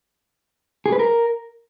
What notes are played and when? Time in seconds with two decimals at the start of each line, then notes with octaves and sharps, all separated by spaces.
0.86 G#4
0.92 B4
0.99 A#4